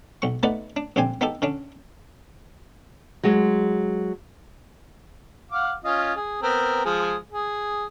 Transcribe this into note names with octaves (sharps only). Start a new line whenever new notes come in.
B1 C#6
A3 B3 D#4 B4 D5 F#5
D4
A#1 D3 C4 G4 G#5
B3 D#4 G4 A4
D3 C#4 D4
F#3 G#3
F5 F#5 D6
C#4 F4 D#5
G#4
B3 C4 A#4
F3 G#3 G#4
G#4